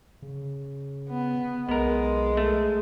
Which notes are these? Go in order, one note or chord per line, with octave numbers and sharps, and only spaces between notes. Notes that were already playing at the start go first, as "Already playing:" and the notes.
C#3
B3
B1 G#3 B3 A#4
A3